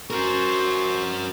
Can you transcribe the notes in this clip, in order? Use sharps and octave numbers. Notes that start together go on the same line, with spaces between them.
F#4 A#4 C5 C#6